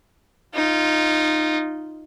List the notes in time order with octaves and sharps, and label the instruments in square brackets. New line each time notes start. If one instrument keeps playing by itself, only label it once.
[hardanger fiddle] D#4 F4